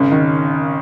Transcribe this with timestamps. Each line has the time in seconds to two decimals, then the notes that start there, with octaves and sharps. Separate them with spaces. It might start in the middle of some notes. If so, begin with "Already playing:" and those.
Already playing: G#1 C#3 C#4
0.12 D#3